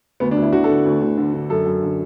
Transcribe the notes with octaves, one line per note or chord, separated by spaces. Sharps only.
D2 B3
D4
D2
E4
D3 F#4
A4
D3
D2
D2
D3
D3
F#2 A4
F#2
D3